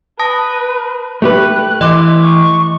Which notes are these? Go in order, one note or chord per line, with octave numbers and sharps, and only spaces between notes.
B4 A5 D#6 A#6
A3 G4 B4 F#6
E3 D#5 C6 D6
C#6